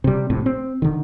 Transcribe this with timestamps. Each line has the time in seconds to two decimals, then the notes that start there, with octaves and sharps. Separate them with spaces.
0.04 C3 G3
0.30 A#1 A2 C3
0.46 C4
0.82 D3 D#3